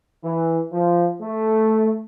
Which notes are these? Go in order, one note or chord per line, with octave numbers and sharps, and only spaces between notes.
E3
F3
A3